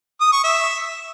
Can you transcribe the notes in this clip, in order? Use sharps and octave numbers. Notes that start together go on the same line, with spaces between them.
D#6
C#6
E5